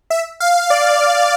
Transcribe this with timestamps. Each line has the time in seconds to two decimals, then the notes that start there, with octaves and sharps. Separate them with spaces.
0.10 E5
0.40 F5
0.70 D5